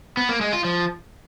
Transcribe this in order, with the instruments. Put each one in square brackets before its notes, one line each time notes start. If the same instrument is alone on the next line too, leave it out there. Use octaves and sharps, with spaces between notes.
[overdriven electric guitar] B3
A#3
G#3
F4
F3